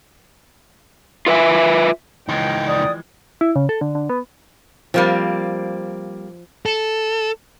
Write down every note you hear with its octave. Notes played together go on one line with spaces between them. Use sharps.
F4 B4 E5 G#5
C#2 E3 F3 G#3 D#4 G5
D5 D#6
E4
C#3
A4
D3
D3
B3
F3 G3 A#3 C4
A4